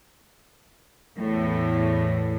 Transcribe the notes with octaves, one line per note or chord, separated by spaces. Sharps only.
E2 A2